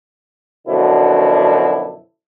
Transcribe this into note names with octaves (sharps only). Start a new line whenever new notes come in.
F#2 B2 D3 F3 D4 E4